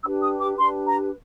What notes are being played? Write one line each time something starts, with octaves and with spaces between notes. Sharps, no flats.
D4 G4 B4 E6
D#6
D6
D4 G4 B4 C6
A#5